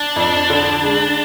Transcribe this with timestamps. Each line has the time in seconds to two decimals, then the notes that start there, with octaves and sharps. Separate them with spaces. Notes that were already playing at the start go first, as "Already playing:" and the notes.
Already playing: D4
0.16 F2
0.50 D3
0.83 G#3